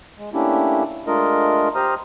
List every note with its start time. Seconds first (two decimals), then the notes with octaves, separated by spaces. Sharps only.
0.18 G#3
0.34 A3 A#3 C#4 D4 E4 G4
1.07 G#3 A3 D4 F4 A#4 D#5
1.75 G4 C5 A#5 D#6 F6